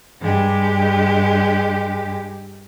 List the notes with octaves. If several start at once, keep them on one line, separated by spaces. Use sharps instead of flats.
G2 G#3 G4